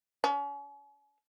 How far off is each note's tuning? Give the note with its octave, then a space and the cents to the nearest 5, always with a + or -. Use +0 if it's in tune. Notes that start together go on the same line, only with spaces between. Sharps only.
C#4 +40